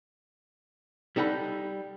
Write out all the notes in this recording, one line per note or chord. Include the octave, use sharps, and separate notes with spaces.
G3 D#4 A4 F#5 B5